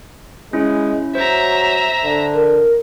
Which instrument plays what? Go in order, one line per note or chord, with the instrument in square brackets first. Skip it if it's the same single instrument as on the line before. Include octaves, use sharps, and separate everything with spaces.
[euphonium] G#3 [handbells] C#4 E4
[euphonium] F#3 [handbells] C5 [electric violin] E5 A#5
[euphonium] D3
[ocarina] A#4